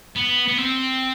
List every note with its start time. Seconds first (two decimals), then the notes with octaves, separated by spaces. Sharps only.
0.16 B3
0.48 B3
0.58 C4